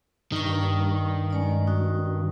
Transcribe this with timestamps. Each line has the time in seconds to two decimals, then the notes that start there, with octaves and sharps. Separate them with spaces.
0.32 G2 D#3 D#4 C#6
1.30 G#3 C#4 D5
1.67 C#4 D#4 F#4